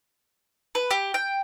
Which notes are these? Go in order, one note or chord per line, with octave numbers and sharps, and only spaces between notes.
B4
G4
G5